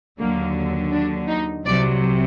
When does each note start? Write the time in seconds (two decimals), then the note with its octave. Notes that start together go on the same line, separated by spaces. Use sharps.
0.19 D#2 D3 F#3 A#3
0.92 D4
1.28 D#4
1.65 C2 C3 F#3 D5